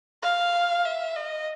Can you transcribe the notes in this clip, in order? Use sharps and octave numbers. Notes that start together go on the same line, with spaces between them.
F5
E5
D#5